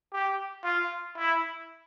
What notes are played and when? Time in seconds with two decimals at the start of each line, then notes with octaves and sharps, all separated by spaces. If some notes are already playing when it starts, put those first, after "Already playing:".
0.13 G4
0.64 F4
1.17 E4